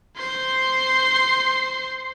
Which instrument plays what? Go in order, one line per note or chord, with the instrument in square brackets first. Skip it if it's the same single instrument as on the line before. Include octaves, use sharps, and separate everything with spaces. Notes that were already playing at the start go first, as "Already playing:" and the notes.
[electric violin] C5 C6